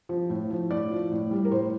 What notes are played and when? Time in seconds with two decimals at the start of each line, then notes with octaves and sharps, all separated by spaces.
0.09 F3
0.30 A2
0.50 F3
0.71 A2 D5
0.91 F3
1.12 A2
1.31 G3
1.45 A#4
1.52 A2 C5